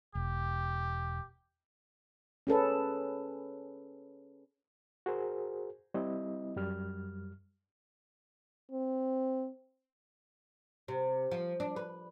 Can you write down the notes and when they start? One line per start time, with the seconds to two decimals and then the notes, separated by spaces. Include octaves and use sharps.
0.15 E1 G4
2.47 C#4 G#4 A4 B4
5.06 F#4 G#4 A#4 C5
5.94 G3 C4 E4 D#5
6.56 F#2 G3 F6
8.72 C4
10.88 C3
11.31 F3
11.60 D4
11.76 B4